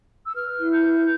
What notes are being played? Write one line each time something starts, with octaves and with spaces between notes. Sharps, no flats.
E6
B4 F6
E4
G6
B4